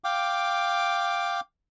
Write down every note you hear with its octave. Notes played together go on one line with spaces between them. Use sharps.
F5 G5 D6